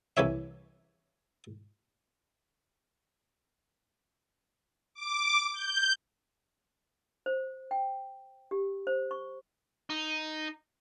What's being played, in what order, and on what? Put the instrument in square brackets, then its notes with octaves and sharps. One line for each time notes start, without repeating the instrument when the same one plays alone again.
[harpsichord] C2 C3 E3 C#5 E5
[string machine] D6
G6
[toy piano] C5
G5
G4
C5
C#6
[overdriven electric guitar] D#4